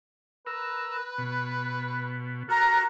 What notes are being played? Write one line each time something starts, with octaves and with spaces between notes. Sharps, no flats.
A#4 B4 E6
B2
F#4 A4 A#4 A#5